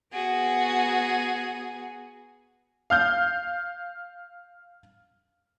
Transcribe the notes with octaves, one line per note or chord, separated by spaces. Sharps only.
B3 F#4 G#4
F5 F6 G6